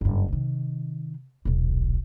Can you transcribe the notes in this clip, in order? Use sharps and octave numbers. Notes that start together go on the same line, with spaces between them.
F#1 G2
C3 D#3
D#1 B1